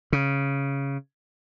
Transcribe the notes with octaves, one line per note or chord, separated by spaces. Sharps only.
C#3